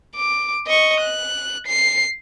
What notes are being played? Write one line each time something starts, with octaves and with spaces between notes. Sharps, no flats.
D6
D#5 C#6
F#6
C7